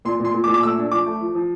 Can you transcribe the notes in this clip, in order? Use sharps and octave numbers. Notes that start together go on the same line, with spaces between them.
A#2 C6
A#2 C6
A#2
D6
A#2
D6
A3 E6
D4
F3 D6
A3
F3
F3